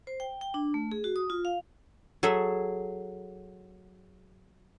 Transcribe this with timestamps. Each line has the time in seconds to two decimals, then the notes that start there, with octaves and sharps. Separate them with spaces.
0.07 C5
0.20 G5
0.41 G5
0.54 D4
0.74 A3
0.92 G#4
1.04 F#4
1.16 D#6
1.30 F4
1.45 F5
2.23 F#3 G#4 A4 E5